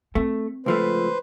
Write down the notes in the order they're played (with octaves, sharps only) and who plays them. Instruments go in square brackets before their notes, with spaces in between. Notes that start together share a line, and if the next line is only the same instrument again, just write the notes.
[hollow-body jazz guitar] A3 [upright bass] C4
[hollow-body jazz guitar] C#2 F3 A3 [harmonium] B4 C5